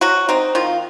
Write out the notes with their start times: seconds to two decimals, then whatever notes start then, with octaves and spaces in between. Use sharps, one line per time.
0.01 F#3 F#4
0.29 C4 D#4
0.55 D#3 F4